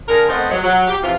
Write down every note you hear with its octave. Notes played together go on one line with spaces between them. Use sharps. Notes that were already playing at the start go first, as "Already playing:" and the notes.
D3 G#4 A#4
A3 B3 C4 C5 D#5
F#3
F#3
G4
C3 E3 F3 F4